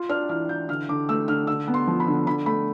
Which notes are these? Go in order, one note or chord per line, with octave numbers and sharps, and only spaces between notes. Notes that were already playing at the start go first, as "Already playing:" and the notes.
Already playing: F4
D4 F6
E3 F6
E3 G6
D3 F6
D3 D6
A3 E6
D3 F6
D3 E6
B3
C6
F3
B5
D3
D3 B5
A3 B5